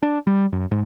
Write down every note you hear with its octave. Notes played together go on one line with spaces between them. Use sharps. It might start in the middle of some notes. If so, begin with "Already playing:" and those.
D4
G3
F#2
G#2